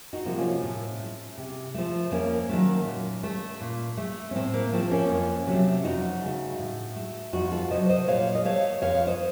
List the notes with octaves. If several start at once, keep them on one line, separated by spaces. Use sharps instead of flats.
D#4 F#4
C3 F3 A#3
C#4 F4
A2
A3
C3
F3 A3
F2 A#3 C#4
D#3 F#3 A3
A#2
A3
A#2
A3
C#4
A2 C4
A#3
F3 A3 C4
A#3 C#4
F2
C3 F#3 A3
F2 D#4 F#4
C#3 A3
A2
A3
F2 D#4 F#4
F4 A4
C3 F#3 C5 D#5
C5 D#5
A#2 C#5 F5
D#5
A3 C#5 F5
F2 C#5 F5
C5 D#5